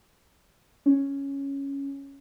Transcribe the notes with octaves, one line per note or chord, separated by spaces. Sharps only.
C#4